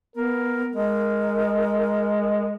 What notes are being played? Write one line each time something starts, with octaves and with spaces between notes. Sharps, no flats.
B3 A#4
G#3 A#4